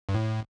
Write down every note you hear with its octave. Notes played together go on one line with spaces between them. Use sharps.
G2
A2